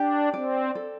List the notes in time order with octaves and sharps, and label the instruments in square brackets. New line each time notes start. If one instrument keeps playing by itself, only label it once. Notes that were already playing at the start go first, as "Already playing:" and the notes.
Already playing: [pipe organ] D4 [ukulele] G4
[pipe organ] C4 [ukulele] D5
[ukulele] A4